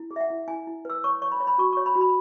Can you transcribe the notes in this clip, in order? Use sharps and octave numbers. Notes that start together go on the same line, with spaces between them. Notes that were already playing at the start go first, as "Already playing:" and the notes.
Already playing: E4
G#4
E5
F#5
E4
E4 G#5
E4
B4 E6
C#5 C#6
C#5 C#6
B5
C#5
B5
F#4 C#6
C#5 C#6
B5
F#4
B5